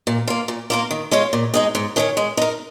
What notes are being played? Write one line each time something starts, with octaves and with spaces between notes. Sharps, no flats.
A#2
A#3 F4
A#2
A#3 F4 A#4
D#3
G#3 C#4 F4 C#5
A#2
G#3 D#4 G#4
G#2
D#3 C#4 A#4 C#5
G#3
D#4 A#4